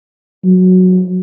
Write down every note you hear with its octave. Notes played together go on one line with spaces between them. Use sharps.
F#3